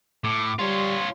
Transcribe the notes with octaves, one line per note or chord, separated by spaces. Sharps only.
A2 D6
G3 F4 C#5 C6